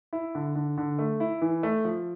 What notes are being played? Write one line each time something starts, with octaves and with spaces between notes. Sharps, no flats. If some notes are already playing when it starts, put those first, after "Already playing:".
E4
D3
D3
D3
A3
E4
E3
A3
F3